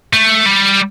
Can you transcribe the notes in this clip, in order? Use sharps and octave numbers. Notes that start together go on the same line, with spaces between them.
A3
G3